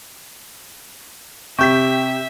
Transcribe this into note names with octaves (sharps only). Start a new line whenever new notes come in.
C3 G4 E5 G5 C#6 G6 B6